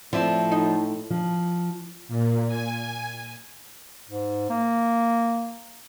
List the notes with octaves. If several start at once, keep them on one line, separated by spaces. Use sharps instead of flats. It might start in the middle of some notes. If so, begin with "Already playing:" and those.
A2 F3 C4 D5 E5
D#4
F3
A#2
G#5
G#2
A#3